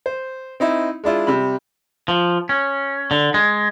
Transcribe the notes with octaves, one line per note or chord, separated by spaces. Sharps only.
C5
C4 D#4 E4
G#3 D4 E4 F4
C3 G3 B5
F3
C#4
D3
G#3